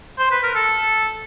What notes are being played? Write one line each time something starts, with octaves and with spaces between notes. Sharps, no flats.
C5
B4
A#4
A4